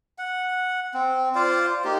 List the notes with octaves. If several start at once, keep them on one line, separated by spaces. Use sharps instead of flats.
F#5
C4
F4 C5 D5 F5
A#3 D#4 G4